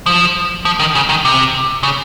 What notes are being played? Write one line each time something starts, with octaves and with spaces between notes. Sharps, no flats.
F3
F3
D#3
C#3
D#3
C3
C#3